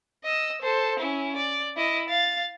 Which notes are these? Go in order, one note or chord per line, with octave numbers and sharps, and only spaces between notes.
D#5 E6
A4 C5
C#4 E4
D5
E4 D#5
F5 A6